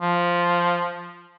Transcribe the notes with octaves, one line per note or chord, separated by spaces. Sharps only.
F3